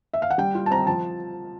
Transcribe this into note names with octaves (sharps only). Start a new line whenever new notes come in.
E5
F5
F#5
G3 G5
F4
A5
C4 A#5
F3 A5